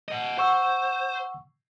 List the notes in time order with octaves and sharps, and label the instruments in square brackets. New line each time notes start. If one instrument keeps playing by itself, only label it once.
[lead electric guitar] D#5 F#5
[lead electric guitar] C5 [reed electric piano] F#5 C#6 E6